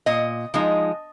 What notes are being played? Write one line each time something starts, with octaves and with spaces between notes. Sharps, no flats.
A#2 D#5
F3 G#3 D#4